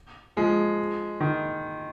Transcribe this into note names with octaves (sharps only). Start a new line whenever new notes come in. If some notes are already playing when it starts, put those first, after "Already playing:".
F3 G#3
D#3